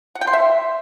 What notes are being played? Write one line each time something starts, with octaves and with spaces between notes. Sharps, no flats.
F#5
G5
C6
E5